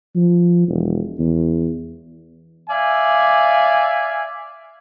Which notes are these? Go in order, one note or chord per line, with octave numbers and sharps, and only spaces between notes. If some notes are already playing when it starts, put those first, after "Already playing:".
F3
E1
E2
D5 E5 F5 G#5